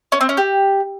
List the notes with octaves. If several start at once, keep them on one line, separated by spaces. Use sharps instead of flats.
C#4
C4
C#4
G4